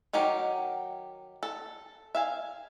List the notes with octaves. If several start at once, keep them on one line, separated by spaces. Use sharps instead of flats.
D#3 F#3 D#4 G4 A#4
A4
E5 F5 G#5